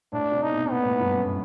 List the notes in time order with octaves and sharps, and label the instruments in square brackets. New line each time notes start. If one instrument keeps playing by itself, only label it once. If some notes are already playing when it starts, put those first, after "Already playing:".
[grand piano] A2 [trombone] D4
[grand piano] C3
[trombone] D#4
[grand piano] B2
[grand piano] A#2 [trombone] B3
[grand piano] A2
G2
F#2